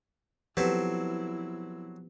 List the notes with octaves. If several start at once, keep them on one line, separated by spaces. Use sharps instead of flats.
F3 F#3 B3 C4 E4 G4 A4 B4